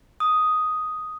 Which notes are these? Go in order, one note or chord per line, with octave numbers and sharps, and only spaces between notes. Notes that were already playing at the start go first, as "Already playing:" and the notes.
D#6